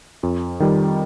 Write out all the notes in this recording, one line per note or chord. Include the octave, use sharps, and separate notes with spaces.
F2
D#3 G3